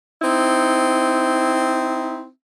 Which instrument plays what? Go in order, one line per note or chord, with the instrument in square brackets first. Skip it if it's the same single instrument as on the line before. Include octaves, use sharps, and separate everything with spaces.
[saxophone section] C4 D#4 E4